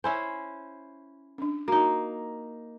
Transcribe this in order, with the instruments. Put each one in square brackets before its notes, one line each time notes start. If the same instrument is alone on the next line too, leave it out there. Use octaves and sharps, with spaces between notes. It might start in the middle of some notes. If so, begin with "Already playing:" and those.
[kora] C#4 E4 C5 [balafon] E5 G#5
[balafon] C#4 D4
[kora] A#3 D#4 [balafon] F#4